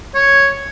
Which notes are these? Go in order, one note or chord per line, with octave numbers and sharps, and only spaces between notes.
C#5